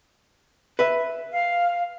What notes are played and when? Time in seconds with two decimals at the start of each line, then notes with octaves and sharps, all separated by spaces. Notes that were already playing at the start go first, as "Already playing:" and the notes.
0.79 B4 E5
1.31 F5